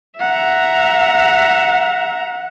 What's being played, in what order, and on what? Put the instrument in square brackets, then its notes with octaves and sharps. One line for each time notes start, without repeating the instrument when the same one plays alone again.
[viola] E5 A#5 [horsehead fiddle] F#5